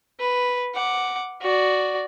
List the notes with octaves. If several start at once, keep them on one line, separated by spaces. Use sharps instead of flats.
B4
F#5 D6
F#4 D5